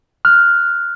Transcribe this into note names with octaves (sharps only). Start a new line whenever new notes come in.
F6 F#6